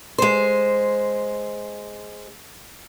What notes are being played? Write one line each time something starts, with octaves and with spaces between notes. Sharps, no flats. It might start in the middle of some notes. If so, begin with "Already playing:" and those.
G#3 C5